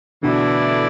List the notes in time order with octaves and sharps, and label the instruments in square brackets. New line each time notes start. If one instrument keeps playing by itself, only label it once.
[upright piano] B2 D3 [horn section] E3 A3 E4 A4 D5